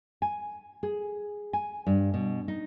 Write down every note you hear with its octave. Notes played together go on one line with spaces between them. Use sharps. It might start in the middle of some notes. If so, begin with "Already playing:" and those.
G#5
G#4
G#5
G2
B2
D#4